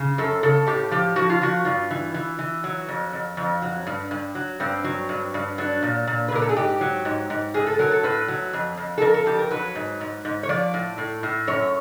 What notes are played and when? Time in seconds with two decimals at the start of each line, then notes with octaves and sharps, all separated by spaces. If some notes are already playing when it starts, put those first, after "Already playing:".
Already playing: C#3
0.18 F#2 A4
0.43 C#3 A4
0.67 A2 G4
0.91 F3 G4
1.16 F3 F#4
1.30 F4
1.42 F3 F#4
1.65 G2 F4
1.91 E3
2.14 E3
2.39 E3
2.64 F#3
2.88 F2
3.13 F2
3.37 F2
3.62 F#3
3.87 G2
4.11 G2
4.35 F#3
4.60 G2 C4
4.84 F#3
5.09 G2
5.34 G2
5.58 F#3 D4
5.83 A#2
6.07 A#2
6.28 B4
6.32 A#2 A#4
6.42 A4
6.49 G#4
6.56 G#2 G4
6.81 F#3
7.05 G#2
7.30 G#2
7.54 A2 G#4
7.67 A4
7.79 F#3 A#4
7.91 A4
8.03 A2 B4
8.28 F#3
8.53 F2
8.77 F2
8.98 A4
9.01 F2 A#4
9.14 A4
9.26 F2 G4
9.39 A#4
9.50 F#3 B4
9.75 G#2
10.01 G#2
10.25 G#2
10.43 C#5
10.49 F3 D5
10.74 A2
10.98 A2
11.23 A2
11.47 F#2 C#5